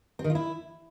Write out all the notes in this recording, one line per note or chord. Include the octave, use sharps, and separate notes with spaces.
C4
D#3
F4
E4